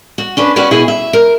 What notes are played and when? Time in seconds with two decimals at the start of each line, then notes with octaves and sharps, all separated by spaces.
0.18 F#4
0.37 C#4 D4 B4
0.56 C#4 F#4 G4 B4 C#5 D5
0.71 B2 E4 G#4 G#5
0.88 E5
1.13 A#4